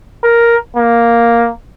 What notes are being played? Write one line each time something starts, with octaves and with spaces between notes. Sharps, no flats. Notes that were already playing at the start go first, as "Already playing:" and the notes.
A#4
A#3